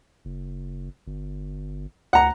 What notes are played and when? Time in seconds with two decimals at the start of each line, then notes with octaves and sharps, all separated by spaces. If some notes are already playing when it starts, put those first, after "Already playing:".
0.25 F#1
1.07 G1
2.13 D2 F#5 A#5